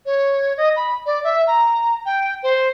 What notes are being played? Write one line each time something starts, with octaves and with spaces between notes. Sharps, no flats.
C#5
D#5
B5
D5
E5
A#5
G5
C5